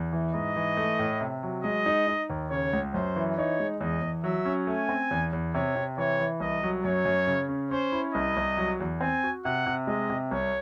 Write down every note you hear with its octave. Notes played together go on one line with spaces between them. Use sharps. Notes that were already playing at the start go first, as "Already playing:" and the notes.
Already playing: E2
E3
G#2 D#5
E3
A3
A2
C3
F#3
G#3 D#5
D#4
D#4
D#2
C#3 C#5
C#2
F#2 C5
E3
D#4 C#5
G#3
E2 D#5
E2
F#3 E5
C#4
A3 G#5
C4
E2
E2
C3 C#5
C3
E3 C#5
E3
C2 D#5
F#3
F#2 C#5
F#2
C#3
C#4
C#4 C5
E4
C2 D#5
C2
F#3
E2
C4 G#5
F#4
C3 F#5
C3
G#3 D#5
C3
C2 C#5